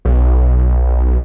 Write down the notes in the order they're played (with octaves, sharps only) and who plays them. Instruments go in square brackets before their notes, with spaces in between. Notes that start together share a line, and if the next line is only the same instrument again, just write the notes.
[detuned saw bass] B1